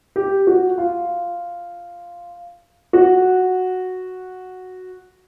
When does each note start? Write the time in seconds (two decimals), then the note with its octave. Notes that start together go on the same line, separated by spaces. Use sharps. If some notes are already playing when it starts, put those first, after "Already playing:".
0.16 G4
0.47 F#4
0.78 F4
2.93 F#4